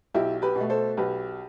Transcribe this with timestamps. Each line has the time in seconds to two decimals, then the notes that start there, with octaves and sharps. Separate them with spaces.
0.14 B1 E4 G4
0.42 G4 B4
0.56 B2 A3
0.70 A4 C5
0.97 B1 G4 B4